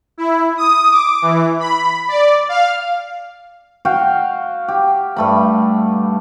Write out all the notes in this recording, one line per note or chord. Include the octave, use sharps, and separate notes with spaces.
E4
D#6
D6
E3
B5
D5
F5
F#4 F5 G5
G4
G2 A3 B5